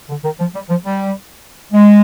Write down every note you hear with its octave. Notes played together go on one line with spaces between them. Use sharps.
D3
D#3
F3
G3
F3
G3
G#3